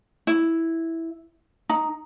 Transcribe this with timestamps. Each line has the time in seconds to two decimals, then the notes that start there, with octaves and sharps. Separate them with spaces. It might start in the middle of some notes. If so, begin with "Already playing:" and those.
0.27 E4
1.69 D#4